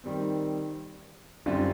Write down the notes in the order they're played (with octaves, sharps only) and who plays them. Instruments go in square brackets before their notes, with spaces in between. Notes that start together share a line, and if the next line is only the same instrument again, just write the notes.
[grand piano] D#3 G3 C4
F#2 D3 G3 C4 F4